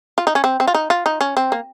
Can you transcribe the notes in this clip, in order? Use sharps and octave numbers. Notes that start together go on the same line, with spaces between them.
F4
D#4
C#4
C4
C4
F4
D#4
F4
D#4
C#4
C4
A#3